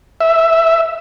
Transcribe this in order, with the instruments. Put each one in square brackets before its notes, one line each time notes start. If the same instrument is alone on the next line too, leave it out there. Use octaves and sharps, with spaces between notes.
[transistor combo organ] E5